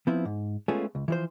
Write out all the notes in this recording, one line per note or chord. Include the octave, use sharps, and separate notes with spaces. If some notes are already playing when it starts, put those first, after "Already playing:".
F3 B3 C4 E4
G#2
G#3 A3 B3 C#4 F4 G#4
C#2
E3 F3 C5